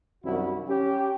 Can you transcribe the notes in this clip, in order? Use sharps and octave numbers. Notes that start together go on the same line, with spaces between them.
C2 F#2 D#3 E4 F#4
C#4 G4